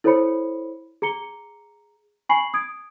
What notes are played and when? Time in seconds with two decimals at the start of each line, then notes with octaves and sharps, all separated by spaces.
0.04 E4 A4 C5 C#5 B5 C#7
1.02 G#4 A#5 C#7 G7
2.29 G#5 B5 C#6 C7 F#7
2.54 D#6 G#6 D7